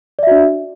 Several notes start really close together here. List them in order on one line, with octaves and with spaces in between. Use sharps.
D5 E5 F#4 D4